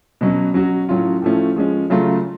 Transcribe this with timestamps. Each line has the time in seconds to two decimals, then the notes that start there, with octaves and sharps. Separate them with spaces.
0.21 B2 F#3 C#4
0.54 F#3 C#4 F#4
0.89 A2 F#3 C#4 F4
1.22 A2 F3 A3 C#4
1.56 F3 G#3 C#4
1.90 C#3 F#3 A3 F4